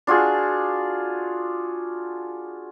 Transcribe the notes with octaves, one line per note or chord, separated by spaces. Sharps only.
D4 F4 F#4 G#4